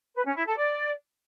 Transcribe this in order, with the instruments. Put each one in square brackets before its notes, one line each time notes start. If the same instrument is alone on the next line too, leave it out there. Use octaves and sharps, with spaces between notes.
[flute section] B4
C#4
E4
A4
D5